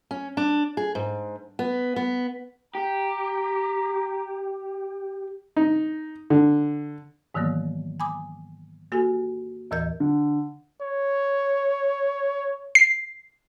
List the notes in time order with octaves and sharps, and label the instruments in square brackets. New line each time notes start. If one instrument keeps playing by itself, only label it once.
[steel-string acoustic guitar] C#4
D4
G#4
G#2
B3
B3
[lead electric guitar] G4 [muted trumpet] A#5
[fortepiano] D#4
D3
[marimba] G#2 D#3 E3 F#3 A#3 B3
G#5 B5 D6 D#6
A#3 F#4 G4 A4 G#5
D#2 A2 E3 A#4 D#5 G6
[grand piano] D3
[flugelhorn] C#5
[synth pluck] C7